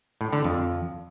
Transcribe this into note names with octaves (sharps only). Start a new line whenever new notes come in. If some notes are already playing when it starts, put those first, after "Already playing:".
A2
D3
F2